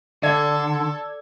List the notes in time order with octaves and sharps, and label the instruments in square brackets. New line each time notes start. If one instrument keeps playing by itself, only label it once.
[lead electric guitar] D3 [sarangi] A4 [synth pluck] D5 G#6